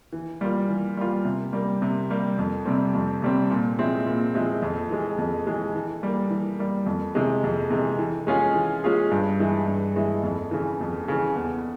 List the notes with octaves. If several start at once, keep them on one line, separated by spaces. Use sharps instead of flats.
E3
G3 A#3 F4
E3
G3 A#3 F4
C3
G3 A#3
C3
G3 A#3
F2
C3 G3 C4
F2
C3 G3 C4
A#2
F3 G#3 C4 E4
A#2
F3 G#3 C4 E4
F2
E3 G#3
F2
E3 G#3
E3
G3 A#3
E3
G3 A#3
F2
C3 E3 G#3
F2
C3 E3 G#3
E3
G#3 C#4 F4 G#4
E3
G#3 C#4 F4 G#4
G2
E3 G#3 E4
G2
E3 G#3 E4
F2
C#3 E3
F2
C#3 E3
E2